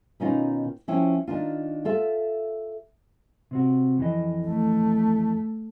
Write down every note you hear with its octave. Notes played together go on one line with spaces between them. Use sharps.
B2 D#3 C#4 D#4 F4
F3 C#4 E4 G5
D#3 D4 F4
F4 A4 E5
C3 C4 F#4
F2 E3 D#5
A3